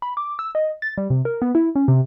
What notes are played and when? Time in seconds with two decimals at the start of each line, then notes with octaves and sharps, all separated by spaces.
0.02 B5
0.17 D6
0.39 E6
0.55 D#5
0.82 A6
0.98 G3
1.10 C3
1.25 A#4
1.42 B3
1.55 E4
1.75 C#4
1.88 C3